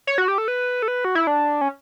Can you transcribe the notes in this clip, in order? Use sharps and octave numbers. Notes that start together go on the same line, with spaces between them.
C#5
F#4
G4
A4
B4
A4
B4
F#4
E4
D4
C#4